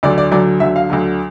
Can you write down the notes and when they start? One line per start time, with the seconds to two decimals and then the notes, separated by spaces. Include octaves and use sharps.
0.03 D2 D3 F#3 D5
0.18 D5
0.31 D2 D3 F#3 D5
0.60 D2 D3 F#3 E5
0.76 F5
0.90 D2 D3 F#3